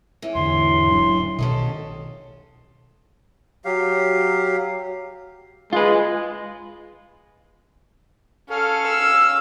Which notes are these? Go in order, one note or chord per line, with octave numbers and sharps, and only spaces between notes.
E3 C#4
E2 G#2 D3 C6
D1 F#3 D4
B1 B2 D#3 C#4 A4 D#5
F#3 G4 F5
G#3 F4 B4
C#4 A4 F5
E6